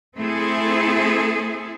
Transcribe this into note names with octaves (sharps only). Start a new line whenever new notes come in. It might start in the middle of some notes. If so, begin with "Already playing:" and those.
A3 C4 E4 G#4 A4